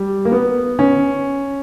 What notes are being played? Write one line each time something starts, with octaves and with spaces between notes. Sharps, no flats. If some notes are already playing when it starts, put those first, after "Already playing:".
Already playing: G3
A#3
B3
C#4